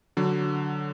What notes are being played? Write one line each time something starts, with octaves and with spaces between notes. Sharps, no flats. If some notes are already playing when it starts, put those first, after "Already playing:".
D3 F#3